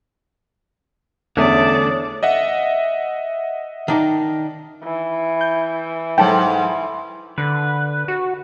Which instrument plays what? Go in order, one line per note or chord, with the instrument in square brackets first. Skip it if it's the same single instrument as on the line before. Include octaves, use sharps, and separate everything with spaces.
[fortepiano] E2 [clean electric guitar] D3 A3 C#4 [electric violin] D4 D5 [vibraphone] C#5 D#6
[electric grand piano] D#5 E5 F#5
[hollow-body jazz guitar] D#3 D4 D#4
[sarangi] E3
[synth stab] G6
[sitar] G#2 [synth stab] F#3 A4 G5
[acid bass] D3 [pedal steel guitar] B4
[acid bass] F#4